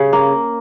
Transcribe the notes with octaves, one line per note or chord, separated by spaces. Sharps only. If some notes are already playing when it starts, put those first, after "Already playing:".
Already playing: C#3
A#3